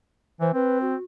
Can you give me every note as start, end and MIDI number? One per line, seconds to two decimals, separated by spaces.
0.40 0.50 52
0.40 0.50 72
0.54 0.95 60
0.54 0.81 71
0.81 1.03 66